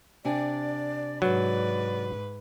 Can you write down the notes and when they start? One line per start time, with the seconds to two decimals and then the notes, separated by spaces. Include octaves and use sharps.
0.25 C3 D4 D5 G#5
1.22 G#2 F#3 B4 D5